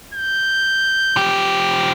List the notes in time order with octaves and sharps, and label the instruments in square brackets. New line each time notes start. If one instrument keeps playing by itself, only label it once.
[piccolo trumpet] G6
[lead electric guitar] F3 G4